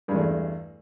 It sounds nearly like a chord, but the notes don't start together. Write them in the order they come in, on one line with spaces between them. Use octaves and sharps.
G2 G#3 E2 A3